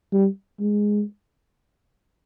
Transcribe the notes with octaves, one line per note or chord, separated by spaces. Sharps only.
G3
G#3